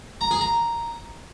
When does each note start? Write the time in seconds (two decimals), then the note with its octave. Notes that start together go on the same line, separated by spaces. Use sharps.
0.21 A#5
0.31 G#4
0.41 A#5